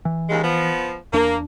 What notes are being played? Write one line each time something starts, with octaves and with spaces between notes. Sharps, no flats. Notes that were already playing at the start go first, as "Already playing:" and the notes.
E3
D#2 C#3 G#3
F3 B3
E2 A#3 D4